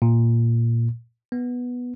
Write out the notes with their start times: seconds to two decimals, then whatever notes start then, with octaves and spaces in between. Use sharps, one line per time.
0.02 A#2
1.32 B3